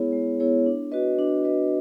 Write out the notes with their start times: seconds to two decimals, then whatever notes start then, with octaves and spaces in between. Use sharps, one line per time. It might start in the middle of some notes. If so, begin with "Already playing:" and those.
Already playing: G#3 B3 E4 G#4 C#5
0.12 G#3
0.40 B3 E4 G#4 C#5
0.66 D4
0.92 F#4 B4 D#5
1.19 D4
1.44 F#4 B4 D#5